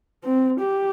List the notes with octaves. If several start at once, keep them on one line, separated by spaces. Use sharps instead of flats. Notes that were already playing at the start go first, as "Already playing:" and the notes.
C4
G4